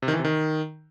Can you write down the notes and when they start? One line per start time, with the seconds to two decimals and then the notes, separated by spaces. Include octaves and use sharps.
0.02 C3
0.08 D#3
0.13 E3
0.19 C3
0.25 D#3